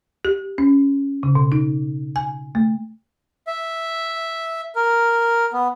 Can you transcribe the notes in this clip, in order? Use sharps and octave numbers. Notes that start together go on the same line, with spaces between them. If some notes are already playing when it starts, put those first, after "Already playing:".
G4
C#4
C#3
B2
D#4
G#5
A3
E5
A#4
B3